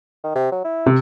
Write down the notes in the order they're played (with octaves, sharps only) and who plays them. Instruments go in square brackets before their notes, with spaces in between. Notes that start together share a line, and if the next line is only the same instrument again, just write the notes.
[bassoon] D#3
C3
F#3
E4
[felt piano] C3